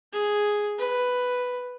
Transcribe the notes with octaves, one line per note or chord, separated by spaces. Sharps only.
G#4
B4